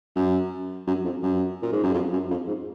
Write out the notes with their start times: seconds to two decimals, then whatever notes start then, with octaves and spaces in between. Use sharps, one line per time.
0.16 F#2
0.87 F#2
1.05 F2
1.23 F#2
1.62 A#2
1.72 G#2
1.83 F#2
1.94 F2
2.13 F#2
2.31 F2
2.47 G#2